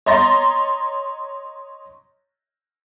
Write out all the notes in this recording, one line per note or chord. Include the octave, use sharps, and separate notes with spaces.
C#5 D#5 A#5 C6 A6 A#6